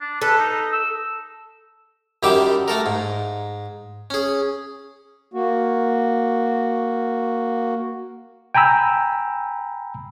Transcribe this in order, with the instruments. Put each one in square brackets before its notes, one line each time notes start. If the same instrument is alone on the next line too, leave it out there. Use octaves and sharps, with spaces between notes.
[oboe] D4
[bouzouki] A4 [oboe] B4
[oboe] D#4
E6
[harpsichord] F#2 D#3 G3 G4 E5 D6
A3 A4 A#4
G#2
C#4 G#4
[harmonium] A#3 F#4
[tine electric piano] G5 G#5 A#5 B5 E6